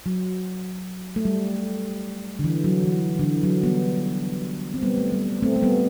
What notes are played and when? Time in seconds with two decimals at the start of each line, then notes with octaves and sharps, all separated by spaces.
0.06 F#3
1.16 A3
1.25 G3
2.39 D3
2.44 E3
2.64 F#3
2.84 E3
3.19 D3
3.24 E3
3.44 F#3
3.63 G3 B3
4.74 C4
4.82 G3 B3
4.97 A3
5.12 G3
5.42 A3 C4
5.56 A3
5.62 G3 B3